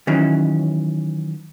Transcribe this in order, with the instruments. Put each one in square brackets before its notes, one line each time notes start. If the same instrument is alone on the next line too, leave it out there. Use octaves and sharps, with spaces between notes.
[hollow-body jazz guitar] D#3 E3 F#3 C#4